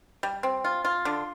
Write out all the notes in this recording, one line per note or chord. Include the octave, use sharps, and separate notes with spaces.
G3
C4
F4
F4
D3